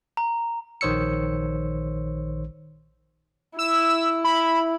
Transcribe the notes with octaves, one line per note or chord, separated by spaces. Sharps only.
A#5
A#1 D#3 C5 C#5 E6 C#7
E4 E6
B5